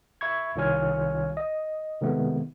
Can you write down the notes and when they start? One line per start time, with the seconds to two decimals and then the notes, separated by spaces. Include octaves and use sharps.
0.21 E5 B5 C#6 G#6
0.56 C2 D#3 F4 C#5 G#5 F6
1.37 D#5
2.01 C3 D#3 G#3 A3 B3